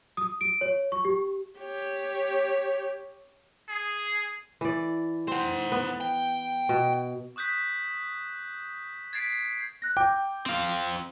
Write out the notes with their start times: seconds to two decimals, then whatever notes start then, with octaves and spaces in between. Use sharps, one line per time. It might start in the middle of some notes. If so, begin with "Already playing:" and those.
0.17 D#6
0.41 D7
0.61 C#5
0.92 C#6
1.05 G4
1.59 G4 C#5
3.69 G#4
4.61 E3 D5
5.28 C4 C5 F#5
5.72 B3
6.01 G5
6.69 B2
7.36 C#6 D#6 F#6 G6 B6
9.13 G#6 A6 B6 C7 D7
9.82 F#6 A#6
9.97 G5 D6
10.46 C4 F5